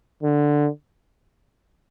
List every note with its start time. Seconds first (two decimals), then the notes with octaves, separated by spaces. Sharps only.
0.23 D3